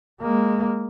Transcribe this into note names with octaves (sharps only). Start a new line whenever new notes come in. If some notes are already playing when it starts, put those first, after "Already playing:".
G#3 A#3